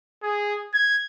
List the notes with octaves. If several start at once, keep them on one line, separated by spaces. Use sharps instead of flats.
G#4
G#6